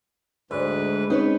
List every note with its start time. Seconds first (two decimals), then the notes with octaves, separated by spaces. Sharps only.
0.51 D2 G#2 B4 C#5 D5
1.10 G#3 C4 C#4 D#4 B4 C#5